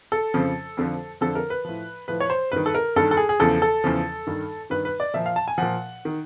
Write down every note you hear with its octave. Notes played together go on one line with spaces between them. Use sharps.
A4
F2 C#3 F3
F2 D3 F3
F2 D3 F3 A4
A#4
B4
A2 F3
A2 F3 B4
C#5
C5
G2 D#3 B4
A4
A#4
G2 D#3 A4
A4
G#4
G#4
E2 C#3 F3 A4
A4
E2 C#3 F3
G2 D#3
G2 D#3 B4
B4
D5
A#2 F3 E5
F5
A5
G#5
A#2 F3 F#5
D#3